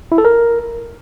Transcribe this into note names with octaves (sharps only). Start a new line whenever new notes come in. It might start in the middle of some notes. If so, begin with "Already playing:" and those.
E4
A4
A#4